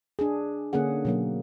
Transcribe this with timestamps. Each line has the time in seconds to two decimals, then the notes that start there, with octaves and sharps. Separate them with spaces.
0.19 D4 G#4
0.73 D3 A#3 C#4 G#4 F#5
1.05 B2 F#3 A#3